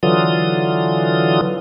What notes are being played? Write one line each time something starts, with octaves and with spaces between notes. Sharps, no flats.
D3 E3 F#3 F4 D#6